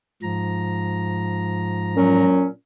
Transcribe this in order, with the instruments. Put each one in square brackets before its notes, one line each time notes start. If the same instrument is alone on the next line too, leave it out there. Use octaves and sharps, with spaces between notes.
[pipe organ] G#2 F3 A#5
[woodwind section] A#2 F#3 C#4